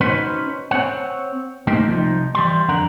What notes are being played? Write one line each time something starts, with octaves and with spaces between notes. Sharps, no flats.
C#4 D#4 F#4 B4 C5
C4 C#5 F#5
A3 A#3 C4 D#4 G4
C2 F3 D#4
E3 G3 C6
F2 D3 A#4 F#5 A#5